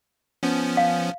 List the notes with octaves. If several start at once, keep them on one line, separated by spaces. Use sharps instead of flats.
F3 B3 C#4
F5